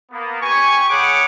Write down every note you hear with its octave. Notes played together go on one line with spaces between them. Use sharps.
A#3 B3
G4 G#5 C#6
G#4 C#5 F#5 G5 B5 D6